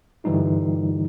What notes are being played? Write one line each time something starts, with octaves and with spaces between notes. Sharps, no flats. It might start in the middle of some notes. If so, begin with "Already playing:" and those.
G2 D3 E3 G3 D#4 F4